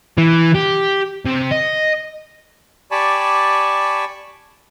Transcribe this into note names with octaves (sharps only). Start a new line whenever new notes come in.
E3
G4
C3
D#5
G4 D5 G#5 A5 B5 C#6